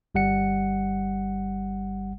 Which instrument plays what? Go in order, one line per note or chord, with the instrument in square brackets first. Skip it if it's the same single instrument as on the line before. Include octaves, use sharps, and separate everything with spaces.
[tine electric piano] G1 G3 F#5 C#7